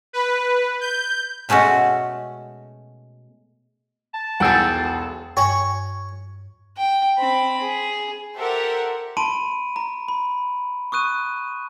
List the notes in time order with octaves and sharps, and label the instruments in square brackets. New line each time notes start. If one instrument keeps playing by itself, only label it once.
[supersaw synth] B4
G6
[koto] B2 G#3 A3 C#4 F#4
[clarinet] A5
[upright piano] E1 B1 E2 [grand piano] G#4 F#5 [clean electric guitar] A4 G5
[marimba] G2 G#5 [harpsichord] C#5
[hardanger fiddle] G5
C4 B5
G#4
[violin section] G4 A4 A#4 C5 E5 F#5
[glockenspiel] A5 B5 C6 D7 D#7
A#5
B5
C#6 D#6 F#6 D#7